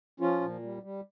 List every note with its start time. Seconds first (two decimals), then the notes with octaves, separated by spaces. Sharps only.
0.20 F3 C#4 F4
0.41 A#2
0.62 G3
0.83 G3